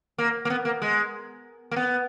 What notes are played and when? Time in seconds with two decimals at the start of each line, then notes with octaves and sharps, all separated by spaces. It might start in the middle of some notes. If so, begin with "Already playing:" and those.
0.18 A#3
0.45 A#3
0.50 B3
0.65 A#3
0.82 G#3
1.71 A#3
1.76 B3